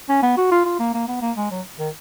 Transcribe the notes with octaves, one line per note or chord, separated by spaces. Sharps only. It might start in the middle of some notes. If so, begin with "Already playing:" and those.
C#4
B3
F#4
F4
F4
A#3
A#3
B3
A#3
G#3
F#3
D#3